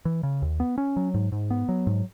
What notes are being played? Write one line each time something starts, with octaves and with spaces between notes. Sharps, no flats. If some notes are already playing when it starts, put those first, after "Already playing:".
E3
C#3
D#2
B3
C#4
F#3
G#2
G#2
B3
F#3
G#2